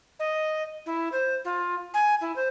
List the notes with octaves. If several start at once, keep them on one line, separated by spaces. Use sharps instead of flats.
D#5
E4
C5
F4
G#5
E4
C5